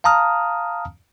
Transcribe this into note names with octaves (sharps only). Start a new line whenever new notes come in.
F5 A5 A#5 D#6 F6